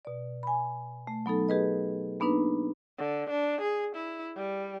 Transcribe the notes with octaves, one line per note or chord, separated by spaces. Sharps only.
B2 D5
G#5 B5
A3
F#3 B3 D#4 A4
G4 G#4 B4 D#5
A#3 B3 D4 D#4 B4
D3
D4
G#4
E4
G3